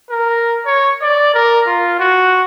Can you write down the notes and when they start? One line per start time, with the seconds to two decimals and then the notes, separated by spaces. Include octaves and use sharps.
0.10 A#4
0.65 C#5
1.02 D5
1.34 A#4
1.66 F4
1.99 F#4